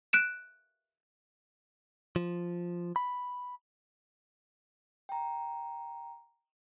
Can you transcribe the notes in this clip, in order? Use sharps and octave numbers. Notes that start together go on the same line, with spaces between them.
F#6 D7 E7
F3
B5
G5 A#5